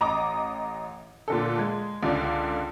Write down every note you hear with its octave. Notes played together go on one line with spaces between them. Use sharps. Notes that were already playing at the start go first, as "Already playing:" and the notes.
A1 D#5 A#5 D6 D#6
A#2 D3 A4
G#3
C#2 D3 F4 D5